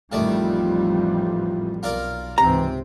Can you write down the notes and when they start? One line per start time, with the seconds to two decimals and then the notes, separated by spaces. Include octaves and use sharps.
0.12 A1 F2 D#3 G3 A3 F4 D5
1.83 B1 F4 A#4 D5
2.38 C#2 G#2 C3 E3 C4 A#5